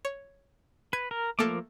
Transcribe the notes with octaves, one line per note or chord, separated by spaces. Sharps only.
C#5
B4 G#6
A#4
F3 A3 A#3 A4 A#4 D6